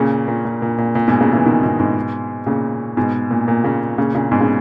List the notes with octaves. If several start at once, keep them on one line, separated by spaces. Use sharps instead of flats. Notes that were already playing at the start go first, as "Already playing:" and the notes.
Already playing: A#2 C#3
A#2
A#2
A#2
A#2
A#2
G#2 B2
A#2 C#3
C#3 E3
B2 D#3
G#2 B2
G#2 B2
A#2 C#3
G#2 B2
A#2
A#2
A#2 C#3
A#2 C#3
A#2 C#3
G#2 B2
C#3